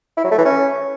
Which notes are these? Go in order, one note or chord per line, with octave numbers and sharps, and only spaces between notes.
E4
F#3
A3
E3
C#4